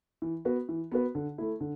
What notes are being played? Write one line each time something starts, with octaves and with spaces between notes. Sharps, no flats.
E3
B3 F#4 B4
E3
B3 F#4 B4
D3
A3 E4
D3